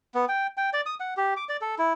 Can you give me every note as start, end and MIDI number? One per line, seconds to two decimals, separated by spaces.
0.15 0.25 59
0.28 0.47 79
0.57 0.70 79
0.73 0.81 74
0.86 0.95 87
1.00 1.14 78
1.17 1.34 67
1.37 1.45 86
1.49 1.57 74
1.61 1.75 69
1.78 1.93 64